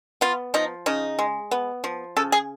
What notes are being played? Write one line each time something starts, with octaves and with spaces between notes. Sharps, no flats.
B3 F4
F3 D#4
C#3 D#4
G#3
B3
F3
C#3 A4
G#4